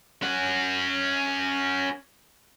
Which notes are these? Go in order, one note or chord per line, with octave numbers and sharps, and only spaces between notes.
C#4 F#5